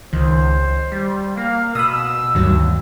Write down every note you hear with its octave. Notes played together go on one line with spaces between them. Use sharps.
C#2 D#3 C5
G3
A#3 F5
B2 B5 D#6 E6
D2 G2 D#3 F#3